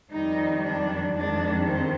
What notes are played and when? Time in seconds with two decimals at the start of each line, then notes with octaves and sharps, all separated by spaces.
0.10 F2 D#3 G3 D#4
0.63 D4
1.13 F2 D#3 G#3 D4
1.65 C4